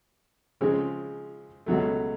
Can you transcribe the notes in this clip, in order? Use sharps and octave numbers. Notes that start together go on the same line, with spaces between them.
C#3 F3 G#3 C4
C#2 B2 F#3 A3